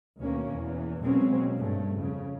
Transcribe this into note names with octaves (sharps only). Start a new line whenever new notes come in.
D2 B2 D#3 A#3 C#4
E2 E3
B2 F#3 G#3 A#3 C4 C#4
G2 A3
F2 C#3